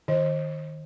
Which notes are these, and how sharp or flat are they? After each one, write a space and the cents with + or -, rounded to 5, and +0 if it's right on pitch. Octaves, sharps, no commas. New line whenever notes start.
D#3 +0 D#5 +5